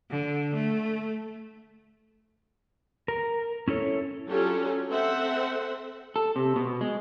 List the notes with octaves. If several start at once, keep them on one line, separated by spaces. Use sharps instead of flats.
D3
A3
A#4
C#4 E4 A4 C#5
F#3 C#4 D4 F4 G4 A4
C4 A4 C5 E5 F#5
A4
C3
B2
G#3